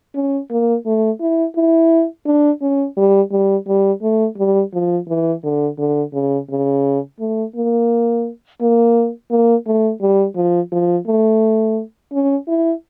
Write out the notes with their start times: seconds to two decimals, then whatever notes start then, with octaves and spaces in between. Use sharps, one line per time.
0.15 C#4
0.51 A#3
0.86 A3
1.20 E4
1.56 E4
2.26 D4
2.61 C#4
2.97 G3
3.32 G3
3.67 G3
4.02 A3
4.37 G3
4.73 F3
5.08 E3
5.43 D3
5.78 D3
6.13 C#3
6.50 C#3
7.19 A3
7.55 A#3
8.61 A#3
9.31 A#3
9.66 A3
10.01 G3
10.36 F3
10.72 F3
11.07 A3
12.12 C#4
12.48 E4